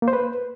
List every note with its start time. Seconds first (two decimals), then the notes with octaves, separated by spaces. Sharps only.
0.02 A#3
0.08 C5
0.13 B4